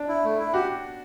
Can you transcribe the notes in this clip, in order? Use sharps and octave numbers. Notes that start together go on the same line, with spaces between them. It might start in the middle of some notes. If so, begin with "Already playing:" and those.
Already playing: D4
E4
A3
E4
F#4 G4